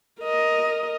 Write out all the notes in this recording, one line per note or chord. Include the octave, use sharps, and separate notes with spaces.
A#4 D#5